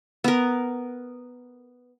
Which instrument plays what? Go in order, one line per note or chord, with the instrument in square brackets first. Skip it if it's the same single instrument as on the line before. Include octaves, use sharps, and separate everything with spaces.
[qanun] B3 A#4